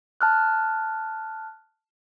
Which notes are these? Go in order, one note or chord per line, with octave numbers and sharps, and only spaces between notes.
A5 F6 F#6